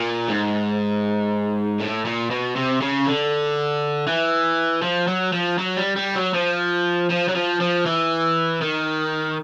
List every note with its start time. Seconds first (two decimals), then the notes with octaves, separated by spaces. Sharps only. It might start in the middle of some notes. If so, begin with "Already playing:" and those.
Already playing: A#2
0.28 G#2
1.80 A2
2.05 A#2
2.30 B2
2.56 C3
2.81 C#3
3.06 D3
4.07 E3
4.83 F3
5.08 F#3
5.33 F3
5.59 F#3
5.77 G3
5.96 G3
6.15 F#3
6.34 F3
7.10 F3
7.28 F#3
7.35 F3
7.61 F3
7.86 E3
8.61 D#3